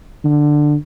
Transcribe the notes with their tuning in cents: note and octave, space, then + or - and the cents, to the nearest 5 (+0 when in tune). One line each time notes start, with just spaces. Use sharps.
D3 +10